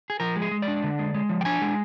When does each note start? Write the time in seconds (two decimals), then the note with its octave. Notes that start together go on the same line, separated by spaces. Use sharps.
0.10 G#4
0.20 F3 A#4
0.36 G#3
0.42 G#4
0.51 G#3
0.62 D5
0.68 D4
0.84 D3
0.99 G#3
1.15 G#3
1.29 F3
1.41 G5
1.45 D4 G#5
1.62 G#3